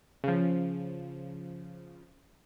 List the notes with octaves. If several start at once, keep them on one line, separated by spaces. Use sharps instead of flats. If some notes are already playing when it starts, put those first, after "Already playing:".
C#3 F3